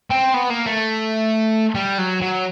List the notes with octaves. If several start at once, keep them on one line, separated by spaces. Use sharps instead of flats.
C4
B3
A#3
A3
G3
F#3
F#3